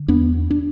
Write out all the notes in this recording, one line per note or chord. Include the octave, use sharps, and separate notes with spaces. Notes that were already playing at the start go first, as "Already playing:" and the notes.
Already playing: D3
E2 B3 D4
D4